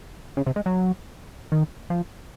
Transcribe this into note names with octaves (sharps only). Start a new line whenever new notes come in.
C#3
C3
G#3
F#3
D#3
F3